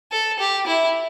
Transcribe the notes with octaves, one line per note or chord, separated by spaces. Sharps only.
A4
G4
E4